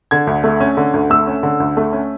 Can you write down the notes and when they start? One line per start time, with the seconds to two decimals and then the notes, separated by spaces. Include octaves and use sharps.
0.11 D3 G#6
0.27 D2
0.44 A3
0.60 C#4
0.77 D3
0.94 D2
1.10 A3 E6
1.27 C#4
1.43 D3
1.60 D2
1.77 A3
1.93 C#4